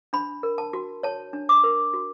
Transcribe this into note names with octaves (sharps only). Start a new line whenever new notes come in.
D4 B5
A#4
A5
F#4
C#5 A5
D4
D6
A#4
F#4